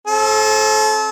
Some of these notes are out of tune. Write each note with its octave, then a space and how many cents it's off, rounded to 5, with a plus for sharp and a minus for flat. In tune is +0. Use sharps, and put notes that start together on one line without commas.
C4 +35 A4 -30